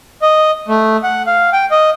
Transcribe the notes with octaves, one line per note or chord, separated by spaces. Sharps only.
D#5
A3
F#5
F5
G5
D#5